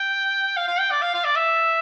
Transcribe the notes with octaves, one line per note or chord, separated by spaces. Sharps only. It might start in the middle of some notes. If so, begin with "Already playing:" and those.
Already playing: G5
F5
F5
G5
D5
F5
F5
D5
E5